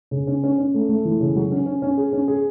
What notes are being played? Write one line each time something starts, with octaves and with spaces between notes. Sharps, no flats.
C#3
C#4
C#4
C#4
A3
A3
E3
C#3
F#3
C#4
C#4
C#4
G#4
C#4
G#4